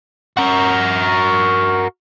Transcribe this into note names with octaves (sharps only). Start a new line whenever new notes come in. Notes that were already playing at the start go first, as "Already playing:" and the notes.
F#4 A#4